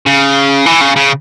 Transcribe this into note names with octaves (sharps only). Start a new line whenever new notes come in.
C#3
E3
C#3
C#3